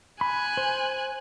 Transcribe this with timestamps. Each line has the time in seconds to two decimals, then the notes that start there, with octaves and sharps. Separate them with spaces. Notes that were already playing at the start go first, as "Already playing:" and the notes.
0.21 G#5 B5 F#6
0.57 C5